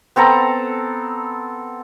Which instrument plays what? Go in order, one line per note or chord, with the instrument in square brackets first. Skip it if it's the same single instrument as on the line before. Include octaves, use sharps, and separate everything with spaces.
[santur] B3 C4 A4 A#5